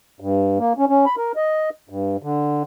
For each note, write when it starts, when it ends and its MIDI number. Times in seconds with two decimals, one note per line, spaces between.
0.20 0.58 43
0.58 0.73 58
0.78 0.85 61
0.89 1.05 61
1.06 1.16 83
1.17 1.32 70
1.36 1.70 75
1.89 2.17 43
2.23 2.63 50